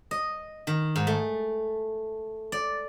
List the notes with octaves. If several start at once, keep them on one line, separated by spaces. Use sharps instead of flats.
D#5
D#3
G#2
A3
D5